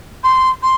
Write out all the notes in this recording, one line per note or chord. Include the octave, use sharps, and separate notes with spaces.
C6
C6